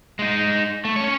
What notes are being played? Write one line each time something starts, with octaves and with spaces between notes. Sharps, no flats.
G#3 D#4
A3
C#4 C#5